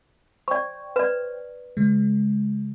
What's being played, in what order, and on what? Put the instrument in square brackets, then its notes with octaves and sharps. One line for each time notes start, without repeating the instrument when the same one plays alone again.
[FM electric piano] C5 G5 [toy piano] D5 C#6
[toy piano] B4 D5
[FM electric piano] C#3 G#3